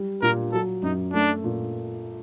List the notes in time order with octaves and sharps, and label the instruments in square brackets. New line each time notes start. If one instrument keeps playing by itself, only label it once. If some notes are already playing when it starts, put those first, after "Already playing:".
Already playing: [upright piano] G3
[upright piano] A#2 [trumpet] A#4
[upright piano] F#3 [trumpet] A4
[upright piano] F#2 [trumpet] D#4
[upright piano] A3 [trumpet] D4
[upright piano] A#2